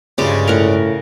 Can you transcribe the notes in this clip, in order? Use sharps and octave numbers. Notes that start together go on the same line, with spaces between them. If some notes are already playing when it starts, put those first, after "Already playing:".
D2 G2 C#3 G3 G#3 F4
A2 A#4 F5 F#5